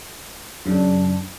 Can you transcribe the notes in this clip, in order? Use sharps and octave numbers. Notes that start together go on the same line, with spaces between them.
F#2 C#3 D4